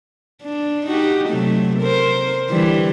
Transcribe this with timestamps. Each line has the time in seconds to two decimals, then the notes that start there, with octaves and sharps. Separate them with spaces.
0.43 D4
0.86 D#4 F#4 G4
1.28 C3 F#3 A3
1.79 A#4 C5
2.50 D3 E3 G3